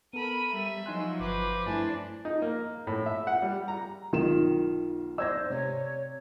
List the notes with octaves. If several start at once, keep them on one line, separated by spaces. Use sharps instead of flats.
B3 A4 A#4 B5 D#7
G3 E5
F3 F#3 D#4 G#5 C6 F#6
G1 B4 C5 D6
G2 A3 D4 E4 G#5
D#4
A#3
A2
E5
F#5
G3
A#5
B1 D#3 F4 E7
C5 D5 E6 G#6 A#6
C3 C#5